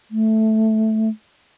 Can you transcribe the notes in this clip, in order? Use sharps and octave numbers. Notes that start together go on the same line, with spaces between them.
A3